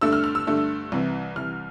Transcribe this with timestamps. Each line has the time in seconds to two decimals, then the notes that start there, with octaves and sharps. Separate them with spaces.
0.01 G2 D3 A3 D4 E6
0.13 F6
0.24 F6
0.35 E6
0.47 G2 D3 A3 D4
0.92 C2 C3 E3
1.36 C2 C3 E3 F6